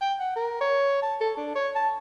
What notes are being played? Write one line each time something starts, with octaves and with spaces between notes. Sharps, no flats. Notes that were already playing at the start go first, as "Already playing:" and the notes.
G5
F#5
A#4
C#5
A5
A4
D4
C#5
A5